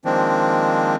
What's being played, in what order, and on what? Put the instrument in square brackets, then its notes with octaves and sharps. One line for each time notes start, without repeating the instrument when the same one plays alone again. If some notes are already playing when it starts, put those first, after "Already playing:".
[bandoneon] D#3 F3 G#3 A#3 C4 D4